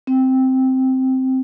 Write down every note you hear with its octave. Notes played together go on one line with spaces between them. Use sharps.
C4